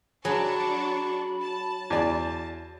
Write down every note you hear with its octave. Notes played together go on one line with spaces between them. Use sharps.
F#3 D4 G#4 A5 B5 C#6
A5
E2 D5